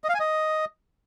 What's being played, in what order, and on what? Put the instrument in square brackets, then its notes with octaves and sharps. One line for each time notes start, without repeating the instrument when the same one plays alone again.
[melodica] D#5
F5
G#5
D#5